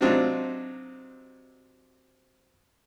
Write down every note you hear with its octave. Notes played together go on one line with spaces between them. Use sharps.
C3 F#3 C4 D4 D#4 F4